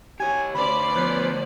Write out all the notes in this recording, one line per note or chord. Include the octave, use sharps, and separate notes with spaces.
G4 C#5 G#5
D2 C#4 B4 C5 D5 B5
F3 B3